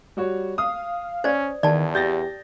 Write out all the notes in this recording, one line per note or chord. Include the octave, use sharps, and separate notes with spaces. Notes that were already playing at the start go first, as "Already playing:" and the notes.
G3 F#4 C#5
F5 D#6
C#4 C5 D5
E2 D#3 D5 A5
G4 G6 A6 A#6